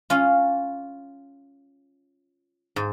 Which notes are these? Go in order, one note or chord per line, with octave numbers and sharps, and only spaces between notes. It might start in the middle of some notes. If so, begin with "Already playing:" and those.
C#4 F4
G#2